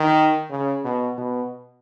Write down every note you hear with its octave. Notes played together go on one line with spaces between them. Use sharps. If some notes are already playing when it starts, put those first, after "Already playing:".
Already playing: D#3
C#3
B2
B2